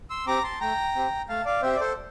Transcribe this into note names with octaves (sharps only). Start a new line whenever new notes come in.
C6 E6
C4 G4 A#5 D6
A5 C6
A3 G5 A#5
C4 G4
A3 F5 A5
D5 F5
C4 G4 C5 E5
D5
A4 C5